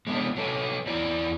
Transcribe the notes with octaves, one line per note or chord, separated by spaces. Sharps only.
G#3 B3 D4
F#3 A4 B4
E2 E4 D5 A#5